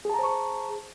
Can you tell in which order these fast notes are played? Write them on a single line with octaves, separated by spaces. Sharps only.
G#4 A5 A#5 C5 C#6